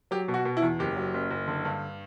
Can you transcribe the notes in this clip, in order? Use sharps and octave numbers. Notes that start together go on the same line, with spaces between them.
F#3 G4
B2
F#4
B2
E4
E2
F#1 G4
F#3
F#1
F#1
D3
G2